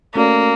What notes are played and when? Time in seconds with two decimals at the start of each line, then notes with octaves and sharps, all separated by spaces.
0.15 A3 A#3 C#4 F#4 A4 D5